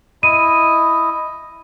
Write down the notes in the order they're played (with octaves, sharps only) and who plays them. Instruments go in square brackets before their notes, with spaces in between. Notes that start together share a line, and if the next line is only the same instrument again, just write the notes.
[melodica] E4 D#5 [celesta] D#7